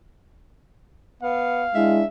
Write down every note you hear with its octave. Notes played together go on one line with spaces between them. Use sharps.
B3 F5
G#3 D4 E4 E5